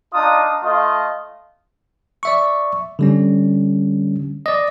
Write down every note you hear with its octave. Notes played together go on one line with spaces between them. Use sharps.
D4 D#4 F4 D#6
A3 F4 D#5
D5 E5 C#6
D3 G3 C#4
D5 D#5